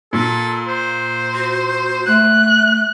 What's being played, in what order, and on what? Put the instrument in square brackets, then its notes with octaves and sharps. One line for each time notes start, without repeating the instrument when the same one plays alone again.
[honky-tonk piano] A#2 [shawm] A4
[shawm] C5
[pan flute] F#4
[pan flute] A3 [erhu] F#6